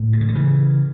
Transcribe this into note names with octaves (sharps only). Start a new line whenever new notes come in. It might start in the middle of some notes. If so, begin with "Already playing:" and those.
Already playing: A2
A#2
C#3
D3
C#3 E3